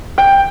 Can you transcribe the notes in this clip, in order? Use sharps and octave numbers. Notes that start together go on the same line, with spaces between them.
G5